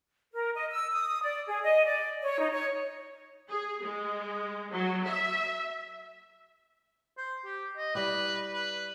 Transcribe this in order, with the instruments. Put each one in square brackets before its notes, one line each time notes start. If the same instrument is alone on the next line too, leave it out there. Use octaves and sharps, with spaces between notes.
[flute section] A#4
D#5
E6
D#6
D5
G#4
D#5
D5
C#5
D#4
C#5
[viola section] G#4
G#3
F#3
E5
[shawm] C5
G4
D#5
[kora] G3 E4 G4 [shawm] B4
[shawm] B4